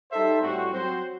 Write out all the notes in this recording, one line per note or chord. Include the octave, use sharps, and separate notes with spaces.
G3 D#4 A4 C5 E5
A2 G3 C4 F#4
F#3 C4 F#4 C5